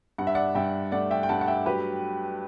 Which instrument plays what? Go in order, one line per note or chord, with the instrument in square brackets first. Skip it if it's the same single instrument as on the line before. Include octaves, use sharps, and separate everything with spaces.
[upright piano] G2 F#5
E5
D5 F#5
G2 E5 G5
A3 D5 F#5
E5 G5
G5
G2 F#5 A5
F#5
E5 G5
F#3 G4 B4